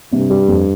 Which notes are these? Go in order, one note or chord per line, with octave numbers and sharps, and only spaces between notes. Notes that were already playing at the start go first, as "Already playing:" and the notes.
G2 C3
G3
F2